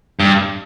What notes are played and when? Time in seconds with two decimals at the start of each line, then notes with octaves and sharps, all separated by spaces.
0.20 G2